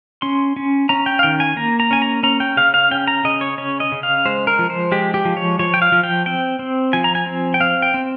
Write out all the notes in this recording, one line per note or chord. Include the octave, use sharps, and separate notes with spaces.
C#4 C6
C#4
C#4 A#5
G5
F5
D#3 G5
G#5
A#3 A#5
A#5
C#4 G#5
A#5
C#4 A#5
G5
C#3 F5
F5
C#4 G5
A#5
C#3 D#5
C#5
C#4 C#5
D#5
C#3
F5
G#3 C5
A#4
F3
C5
G#3 G4
G4
F3
C#5
F3 C#5
G5
F5
F3
G5
C4 G5
C4
F3 G#5
A#5
G#5
C4
G5
C4 F5
G5
C4